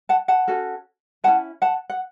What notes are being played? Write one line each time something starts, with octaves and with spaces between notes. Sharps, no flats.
F#5 A5
F#5 A5
C#4 F#4 A4
C#4 E4 G#4 F#5 A5
F#5 A5
F#5